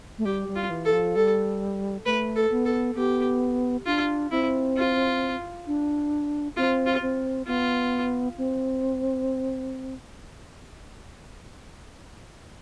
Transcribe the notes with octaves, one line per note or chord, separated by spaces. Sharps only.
A3
G3 G4
G3
F4
E3
A4
F3
G3 A4
A3 B4
A4
B3
A4
B3 G4
D4 F4
C4 E4
F4
D4
C4 F4
F4
C4
B3 F4
C4